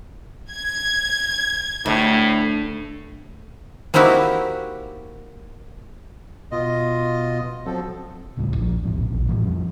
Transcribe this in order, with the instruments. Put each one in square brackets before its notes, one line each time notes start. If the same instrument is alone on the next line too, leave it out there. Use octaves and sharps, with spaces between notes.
[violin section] G#6
[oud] D2 [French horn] A2
[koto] A#3 C4 D#4 E4 F#4 G4
[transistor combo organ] B2 [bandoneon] F4 D#5
[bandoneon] F3 A4 [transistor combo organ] F#3 C4
[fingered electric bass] D#1 C#2 A2 G3
A#1 F3
D#1 A1 G#2 B2
A#1 D#2 B2
A2 E3 F3 G3
F2 F3 G3